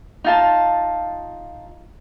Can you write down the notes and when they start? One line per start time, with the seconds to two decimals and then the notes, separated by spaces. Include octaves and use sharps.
0.24 D#4 F4 A5